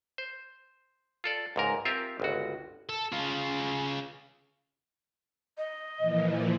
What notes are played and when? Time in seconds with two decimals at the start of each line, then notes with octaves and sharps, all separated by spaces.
0.18 C5
1.24 F4 A4 D5
1.56 C#2 G#2 A#4
1.85 C4 F4 G4 A#4 E5
2.20 G1 C#2 F#4
2.89 A4
3.13 C#3 F4
5.58 D#5
5.98 A#2 E3 F3